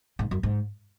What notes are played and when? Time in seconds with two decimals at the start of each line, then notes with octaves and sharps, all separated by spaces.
0.19 G#2
0.31 F#2
0.43 G#2